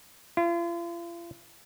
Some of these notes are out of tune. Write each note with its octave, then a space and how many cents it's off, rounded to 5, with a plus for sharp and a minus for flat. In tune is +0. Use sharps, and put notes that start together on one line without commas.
F4 -40